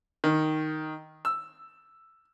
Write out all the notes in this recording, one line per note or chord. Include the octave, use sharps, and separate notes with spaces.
D#3
E6